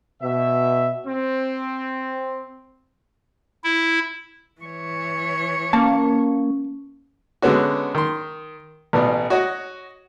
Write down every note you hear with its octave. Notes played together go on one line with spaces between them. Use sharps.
B2 E5
C4
E4
E3 C#5
A#3 C#4 A5
D3 G#3 B3 C#4 F#4
D#3 C6
A1 B2 B3 D5
F#4 C#5 D#5 F#5